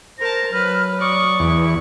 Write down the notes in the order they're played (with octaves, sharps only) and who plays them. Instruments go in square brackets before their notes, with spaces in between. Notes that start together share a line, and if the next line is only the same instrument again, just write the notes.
[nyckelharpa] A#4 A5 [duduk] C5 [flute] A#6
[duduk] F#3 [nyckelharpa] B4 [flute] F6
[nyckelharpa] D5 C#6 [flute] D#6
[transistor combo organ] E2